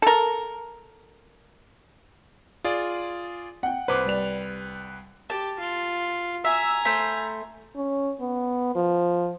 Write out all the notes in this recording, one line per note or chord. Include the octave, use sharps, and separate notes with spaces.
A4 A#4
F4 G#4 D5
F#5 G5
C2 B4 C5 B5 D6
G3 D5 F7
G4 A5
F4
E5 G#5 A#5
A3 C5 B5
C#4
B3
F3